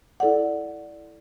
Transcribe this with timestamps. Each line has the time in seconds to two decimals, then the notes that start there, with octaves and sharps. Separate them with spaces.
0.20 E4 A4 D5 F#5